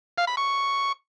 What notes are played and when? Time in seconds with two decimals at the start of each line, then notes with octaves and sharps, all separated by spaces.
0.18 F5
0.27 B5
0.37 C#6